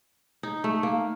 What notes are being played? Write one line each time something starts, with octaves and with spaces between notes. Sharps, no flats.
D#4
A3
A#3